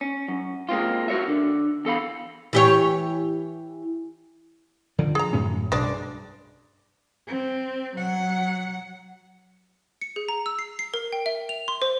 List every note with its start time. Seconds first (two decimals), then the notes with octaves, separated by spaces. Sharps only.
0.01 C#4
0.28 F#2
0.69 G#3 A#3 C4 F4
1.08 F#4 A#4 C#5 E5
1.28 D3
1.85 E2 A4 F5 B5
2.53 E3 G4 C#5
4.98 D3 D#3 F3
5.15 G#4 A#5
5.33 F#2 A2 C#4
5.72 B1 G#3 D4 D5
5.84 G2
7.27 C4
7.96 F#3 F#5
10.01 C#7
10.16 G#4
10.29 A#5
10.46 E6
10.59 C7
10.79 C7
10.94 A#4
11.13 G5
11.26 E5
11.49 F7
11.68 C6
11.82 C5